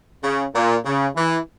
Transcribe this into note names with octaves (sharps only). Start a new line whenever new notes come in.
C#3
A#2
C#3
E3